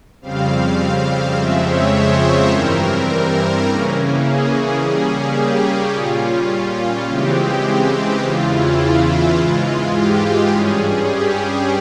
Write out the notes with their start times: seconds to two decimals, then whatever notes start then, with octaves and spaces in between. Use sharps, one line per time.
0.22 F2 C#3 G3 C4 F5
1.36 F2 C#3 F3 G#3 C4 E5
1.65 C#5
1.93 C5
2.51 G2 E3 G3 C4 A#4
3.65 C#3 E3 A#3 C#4
4.22 G#4
4.79 C#3 G3 A#3 C#4
5.36 G4
5.93 A#2 G3 C#4 F4
6.80 F4
7.08 C#3 E3 G#3 C4 G4
8.23 E2 C#3 E3 F4
8.51 E4
9.37 G#2 E3 G#3 F4
9.95 G4
10.52 G2 G3 C#4 G#4
11.10 G4